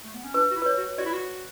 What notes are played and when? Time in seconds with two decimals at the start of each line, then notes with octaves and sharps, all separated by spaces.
0.04 A3
0.14 B3
0.24 C#4
0.34 D4 B4
0.51 F#4
0.56 E4
0.62 B4
0.66 C#5
0.77 F#4
0.98 F#4 D5
1.06 E4
1.13 F#4